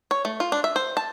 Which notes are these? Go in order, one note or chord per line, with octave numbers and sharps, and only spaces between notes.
C#5
A3
F4
D4
E5
C5
A5